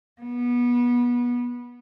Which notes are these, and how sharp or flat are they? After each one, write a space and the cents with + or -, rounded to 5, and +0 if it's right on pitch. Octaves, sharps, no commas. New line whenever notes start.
B3 -25